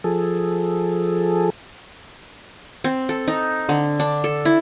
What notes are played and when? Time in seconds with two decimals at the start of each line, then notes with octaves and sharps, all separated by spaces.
0.04 F3 G#4 A4
2.84 C4
3.09 A4
3.28 D#4
3.69 D3
4.00 D4
4.24 A4
4.45 E4